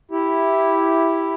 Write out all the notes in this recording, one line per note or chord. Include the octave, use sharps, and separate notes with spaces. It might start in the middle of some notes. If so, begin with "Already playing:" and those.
E4 G4